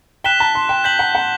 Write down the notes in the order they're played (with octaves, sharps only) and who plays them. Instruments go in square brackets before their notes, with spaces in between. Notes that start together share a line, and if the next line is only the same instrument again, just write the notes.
[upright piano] G5 [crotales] F#6 B6 E7 G7
[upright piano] A5
C6
G5
[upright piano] G5 [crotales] G6 B6 F#7
[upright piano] F#5
F#5